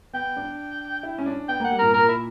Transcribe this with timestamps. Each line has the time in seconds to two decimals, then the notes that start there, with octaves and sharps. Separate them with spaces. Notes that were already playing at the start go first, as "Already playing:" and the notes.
0.13 B3 G5
0.37 D4
1.03 E4
1.19 C#4
1.26 D4
1.49 B3 G5
1.60 A#3 F#5
1.71 G3
1.79 A#2 A#4
1.94 A#2 A#4
2.09 E4